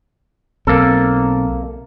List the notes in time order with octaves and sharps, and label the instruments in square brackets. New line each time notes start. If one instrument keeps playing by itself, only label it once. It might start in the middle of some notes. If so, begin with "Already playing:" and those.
[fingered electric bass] B1 C4 [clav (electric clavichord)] A#3 A4